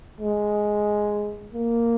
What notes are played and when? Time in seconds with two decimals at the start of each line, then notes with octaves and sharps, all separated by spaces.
0.21 G#3
1.53 A#3